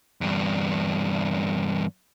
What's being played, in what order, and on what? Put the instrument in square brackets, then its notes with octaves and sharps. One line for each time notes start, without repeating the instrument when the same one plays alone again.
[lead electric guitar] E2 G2